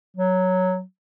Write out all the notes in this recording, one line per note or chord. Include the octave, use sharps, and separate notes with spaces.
F#3